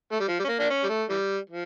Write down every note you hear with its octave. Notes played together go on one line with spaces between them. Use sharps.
A3
G3
F3
G3
C#4
A#3
A#3 D4
C#4
G3
A3
E3 G3
F3